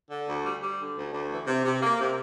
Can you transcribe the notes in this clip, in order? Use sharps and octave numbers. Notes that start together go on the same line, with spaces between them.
D3
D2
G3
G3
D3
D2
D2
E3
C3
C3
A#3
C3